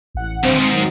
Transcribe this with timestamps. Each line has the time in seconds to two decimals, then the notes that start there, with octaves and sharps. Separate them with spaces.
0.15 A1 F#5
0.43 C2 G2 C4 C5
0.55 D#2 G#2
0.72 D#3 F#3